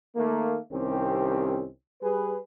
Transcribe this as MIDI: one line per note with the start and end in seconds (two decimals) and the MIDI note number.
0.16 0.57 51
0.16 0.57 57
0.16 0.57 58
0.72 1.65 36
0.72 1.65 51
0.72 1.65 60
0.72 1.65 61
0.72 1.65 67
2.02 2.37 55
2.02 2.37 68
2.02 2.37 71